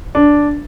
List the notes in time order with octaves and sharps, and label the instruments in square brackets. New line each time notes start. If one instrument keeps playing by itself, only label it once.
[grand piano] D4